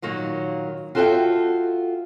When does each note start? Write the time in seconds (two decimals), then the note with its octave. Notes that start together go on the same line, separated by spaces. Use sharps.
0.02 A#2 D#3 F#3 A#3
0.95 F4 F#4 A4 C5 E5 G5